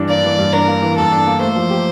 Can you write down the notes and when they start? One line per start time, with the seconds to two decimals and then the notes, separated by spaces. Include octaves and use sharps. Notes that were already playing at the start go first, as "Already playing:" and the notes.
Already playing: G2 E3 D4
0.09 A#3 D5
0.24 E3
0.39 G2
0.53 D4 A#4
0.68 A#3
0.82 E3
0.97 G2 A4
1.12 D4
1.27 A#3
1.41 A3 C5
1.56 F3
1.70 G4